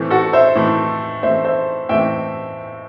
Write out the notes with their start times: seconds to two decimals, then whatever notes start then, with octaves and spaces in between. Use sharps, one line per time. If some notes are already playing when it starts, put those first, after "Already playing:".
Already playing: A2 E3 A3 C4
0.10 F#4 A4
0.33 C5 E5
0.55 A2 E3 A3 C4
1.23 A2 E3 A3 C4 C5 E5
1.45 C5 E5
1.89 A2 E3 A3 C4 E5 G5